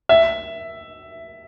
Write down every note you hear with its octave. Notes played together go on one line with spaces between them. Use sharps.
E5